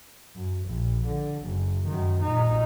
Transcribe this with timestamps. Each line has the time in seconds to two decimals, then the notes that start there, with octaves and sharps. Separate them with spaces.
0.35 F#2
0.65 A#1
1.06 D3
1.43 F#1
1.87 F#2 D#3
2.22 A#2 D#4